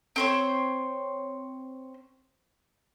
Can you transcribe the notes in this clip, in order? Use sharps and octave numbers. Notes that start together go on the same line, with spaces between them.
C4 C5 C#5